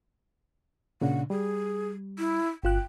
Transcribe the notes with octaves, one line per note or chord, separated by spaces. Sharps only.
A#2 C#3 D4 F#5
G3 G#4
E4
G1 F4 G5 F#6